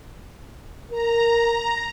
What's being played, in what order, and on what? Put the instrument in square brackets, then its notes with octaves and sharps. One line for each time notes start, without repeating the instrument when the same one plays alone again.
[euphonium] A#4 [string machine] A#5